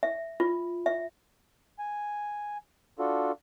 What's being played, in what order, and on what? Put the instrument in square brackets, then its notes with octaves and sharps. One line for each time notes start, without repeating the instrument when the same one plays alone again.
[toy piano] E5
F4
E5
[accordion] G#5
D4 F4 F#4 A4